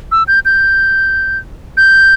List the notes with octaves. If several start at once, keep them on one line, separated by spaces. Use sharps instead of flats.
E6
G6
G6
G6